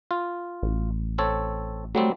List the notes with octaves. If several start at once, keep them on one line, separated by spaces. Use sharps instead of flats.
F4
A1
C4 A4 C#5
F#3 G3 A3 C4